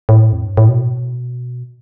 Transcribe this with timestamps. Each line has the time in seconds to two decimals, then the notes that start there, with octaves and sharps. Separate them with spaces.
0.09 A2
0.33 F2
0.45 G2
0.57 A2
0.69 B2